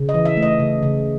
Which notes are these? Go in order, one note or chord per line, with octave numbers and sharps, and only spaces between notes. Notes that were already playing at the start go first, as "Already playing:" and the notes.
Already playing: C#3
D#5
E3
E5
A3
D#5
C#3
C#3